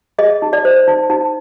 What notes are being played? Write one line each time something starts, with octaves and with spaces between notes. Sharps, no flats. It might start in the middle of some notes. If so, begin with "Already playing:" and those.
G#4 D#5
D#4
D5
C5
D#4
D#4